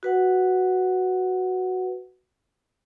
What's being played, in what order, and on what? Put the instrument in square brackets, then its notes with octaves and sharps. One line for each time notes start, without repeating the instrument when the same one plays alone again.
[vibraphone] F#4 B4 F#5